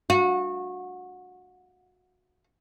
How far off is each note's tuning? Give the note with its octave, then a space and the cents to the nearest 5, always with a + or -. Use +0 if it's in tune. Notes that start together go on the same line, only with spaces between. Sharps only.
F#4 -25